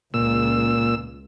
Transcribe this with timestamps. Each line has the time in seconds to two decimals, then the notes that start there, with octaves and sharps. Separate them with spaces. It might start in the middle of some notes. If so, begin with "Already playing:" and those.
0.14 C#2 A#2 E6